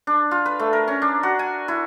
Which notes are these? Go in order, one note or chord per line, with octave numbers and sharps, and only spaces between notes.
D4
F4
B4
A3
A#4
C#4
D4
F#4
G#5
E4